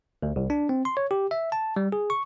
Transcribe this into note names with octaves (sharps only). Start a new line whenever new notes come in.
D2
C2
D4
C4
C6
C#5
G4
E5
A5
G3
G#4
C#6